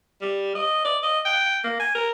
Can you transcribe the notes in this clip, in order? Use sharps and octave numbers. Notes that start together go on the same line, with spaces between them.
G3
D#5
D5
D#5
G5
A#3
G#5
A#4